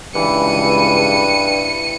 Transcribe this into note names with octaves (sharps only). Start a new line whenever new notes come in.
C#2 G2 E3 C#7 D#7